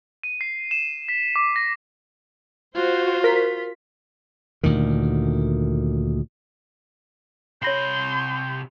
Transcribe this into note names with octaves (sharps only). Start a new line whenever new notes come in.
D#7
C7
E7
B6
D6
A#6
F4 F#4 C5
A#4 B6
D2 A#2 D#3
C3 C#5 B5 C6 G6 A#6 C7